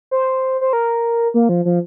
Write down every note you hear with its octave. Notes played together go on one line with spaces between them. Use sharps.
C5
C5
A#4
A#3
F3
F3